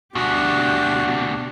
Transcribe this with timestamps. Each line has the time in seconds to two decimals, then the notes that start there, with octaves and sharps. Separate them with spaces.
0.15 D2 B2 D4 F#4 G4